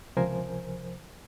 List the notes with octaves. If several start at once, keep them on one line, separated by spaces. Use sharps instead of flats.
C#2 C3 F3 A#4 C5 G#5